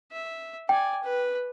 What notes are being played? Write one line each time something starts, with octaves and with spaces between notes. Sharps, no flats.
E5
D5 G5 G#5
B4